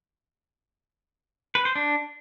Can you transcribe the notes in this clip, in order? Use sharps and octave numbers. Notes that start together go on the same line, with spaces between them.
B4
C5
D4